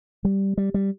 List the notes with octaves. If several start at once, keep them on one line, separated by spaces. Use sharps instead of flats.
G3
G3
G3